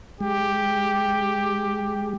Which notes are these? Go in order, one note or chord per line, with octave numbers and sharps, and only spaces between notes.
G#3 G4